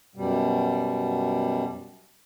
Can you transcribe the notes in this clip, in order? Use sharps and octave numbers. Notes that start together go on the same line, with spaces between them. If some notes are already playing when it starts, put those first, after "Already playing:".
F#2 B2 G3